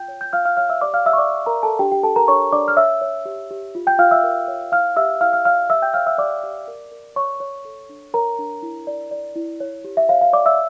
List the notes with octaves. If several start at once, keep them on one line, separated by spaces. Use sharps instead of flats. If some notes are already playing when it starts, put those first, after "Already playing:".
Already playing: F4 G5 G6
C#5
G6
F4 F5 F6
F5 F6
C#5 F5 F6
E5 E6
G4 D5 D6
F5 F6
G4 E5 E6
C#6
D5 D6
D5
A#4 A#5
D5
A4 A5
D4 G4 G5
G4 G5
D4 A4 A5
A#4 A#5
D4 C#5 C#6
D4 D5 D6
F6
C#5 E5 E6
C#5
G4
G4
F4
G5 G6
F4 F5 F6
E5 E6
A#4
C#5
E4 F5 F6
G4 E5 E6
E4 F5 F6
F5 F6
D5 F5 F6
G4 E5 E6
G5 G6
C#5 F5 F6
E5 E6
G4 D5 D6
G4
A#4
A#4
C#5 C#6
C#5
A4
D4
A#4 C#5 A#5
D4
E4
D5
D5
E4
C#5
G4
E5
C#5 F5
F5
C#5 D5 D6
E5 E6